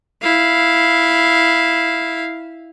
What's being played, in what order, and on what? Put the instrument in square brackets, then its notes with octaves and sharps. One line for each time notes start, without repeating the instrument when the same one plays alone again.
[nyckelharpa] E4 F5